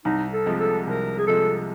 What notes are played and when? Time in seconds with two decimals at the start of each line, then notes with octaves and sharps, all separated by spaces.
0.05 C2 D#4
0.32 A4
0.46 C3 F3 G#3
0.60 A4
0.87 C2 A#4
1.18 G#4
1.27 C3 F3 G#3 A4